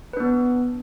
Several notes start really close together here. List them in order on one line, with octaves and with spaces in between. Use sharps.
B4 D4 B3